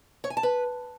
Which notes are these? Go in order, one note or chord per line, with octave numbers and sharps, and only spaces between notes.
C#5
G#5
A5
B4